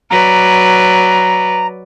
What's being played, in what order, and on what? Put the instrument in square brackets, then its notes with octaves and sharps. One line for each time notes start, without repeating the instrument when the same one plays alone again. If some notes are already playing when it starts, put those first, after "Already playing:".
[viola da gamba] F#3 B4 D5 [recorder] A#5